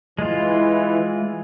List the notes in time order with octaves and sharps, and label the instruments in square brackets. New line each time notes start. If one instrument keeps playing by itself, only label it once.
[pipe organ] E3 [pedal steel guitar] G#3 F4